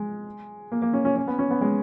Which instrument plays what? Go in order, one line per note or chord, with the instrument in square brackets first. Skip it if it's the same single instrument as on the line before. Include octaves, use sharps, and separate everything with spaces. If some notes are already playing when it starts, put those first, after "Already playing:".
Already playing: [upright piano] G#3
A#3
A#3
C#4
C#4
C#4
B3
C#4
B3
G#3